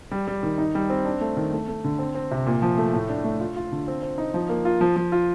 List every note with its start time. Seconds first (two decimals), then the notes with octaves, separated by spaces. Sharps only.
0.11 G3
0.28 G3
0.43 D#3
0.58 D#4
0.75 G3
0.90 C4
1.05 D4
1.21 A3
1.37 D#3
1.53 A3
1.68 A3
1.84 D3
1.99 C4
2.15 C4
2.31 C3
2.46 A#2
2.62 F3
2.78 A3
2.93 A2
3.09 D4
3.24 A3
3.40 F4
3.56 F4
3.72 D3
3.88 C4
4.02 C4
4.18 D#4
4.34 F3
4.49 A#3
4.65 F4
4.81 F3
4.96 F3
5.12 F4